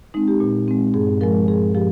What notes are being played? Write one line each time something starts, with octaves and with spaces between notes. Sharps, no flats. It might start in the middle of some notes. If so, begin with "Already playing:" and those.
G#3 C4 D#4
G4
A#2
G#3 C4
G2 G#4
F3 G#3 A#4
G2 G#4
F3 G4